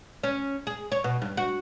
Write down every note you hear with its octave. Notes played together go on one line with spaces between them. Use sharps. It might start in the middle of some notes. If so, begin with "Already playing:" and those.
C#4
G#4
C#5
B2
G2
F#4